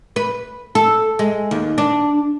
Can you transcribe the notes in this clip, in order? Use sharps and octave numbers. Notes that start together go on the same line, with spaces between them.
B4
A4
G#3
D#2
D4